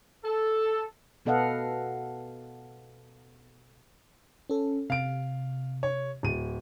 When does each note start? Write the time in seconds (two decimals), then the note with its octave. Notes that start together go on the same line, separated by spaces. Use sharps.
0.25 A4
1.26 B2 B3 A4 D#5 F5 F#5
4.50 C#4 A4
4.90 C3 F5 D7
5.83 C#5
6.23 D1 D#7